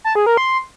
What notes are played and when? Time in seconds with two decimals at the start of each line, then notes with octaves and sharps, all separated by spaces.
0.04 A5
0.15 G#4
0.26 A#4
0.37 C6